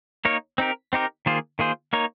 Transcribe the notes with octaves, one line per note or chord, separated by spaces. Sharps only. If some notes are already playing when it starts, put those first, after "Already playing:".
A#3 D#4 A#4 C#5
C4 D#4 G4 A#4
C4 D#4 G4 A#4
D#3 A#3 F4 G#4 C5
D#3 A#3 F4 G#4 C5
A#3 D#4 A#4 C#5